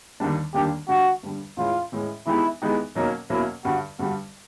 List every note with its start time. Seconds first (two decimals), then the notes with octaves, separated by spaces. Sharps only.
0.20 D#2 D3 G3 A#3 D4
0.54 D#2 D3 G3 A#3 D4 G4
0.88 G2 D3 G3 F#4
1.23 G2 D3 G3
1.57 A2 E3 G#3 C#4 F4
1.92 A2 E3 G#3 C#4
2.26 E3 G#3 B3 D#4 E4 G4
2.62 E3 G#3 B3 D#4 G4
2.95 B2 F#3 A#3 C#4 D#4
3.30 B2 F#3 A#3 C#4 E4
3.64 G2 D3 G3 F#4
3.99 G2 D3 G3 F#4